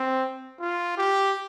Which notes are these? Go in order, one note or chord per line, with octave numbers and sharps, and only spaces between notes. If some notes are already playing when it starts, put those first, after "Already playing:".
Already playing: C4
F4
G4